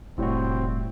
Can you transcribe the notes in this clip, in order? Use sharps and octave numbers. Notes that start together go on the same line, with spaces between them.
E1 A2 C3 G3 C4 F#4